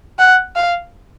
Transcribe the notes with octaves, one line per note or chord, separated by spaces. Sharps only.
F#5
F5